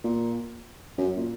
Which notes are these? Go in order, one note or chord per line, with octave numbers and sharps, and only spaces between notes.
A#2
F#2
A#2